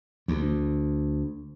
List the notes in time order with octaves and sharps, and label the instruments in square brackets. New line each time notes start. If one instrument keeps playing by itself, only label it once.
[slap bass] D2